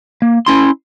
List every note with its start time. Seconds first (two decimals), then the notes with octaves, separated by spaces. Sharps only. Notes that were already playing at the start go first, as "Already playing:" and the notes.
0.22 A#3
0.46 C#4 E4 C6